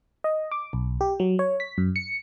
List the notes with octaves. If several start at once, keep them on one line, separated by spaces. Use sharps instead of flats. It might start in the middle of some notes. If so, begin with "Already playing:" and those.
D#5
D6
B1
G4
F#3
C#5
B6
F#2
C#7